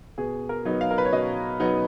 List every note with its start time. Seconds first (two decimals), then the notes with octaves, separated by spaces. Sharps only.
0.18 B2 G#4
0.49 A#4
0.65 F#3 B3 D#4
0.81 F5
0.91 A#4
0.98 B4
1.05 C#5
1.13 B2 D#5
1.60 F#3 B3 D#4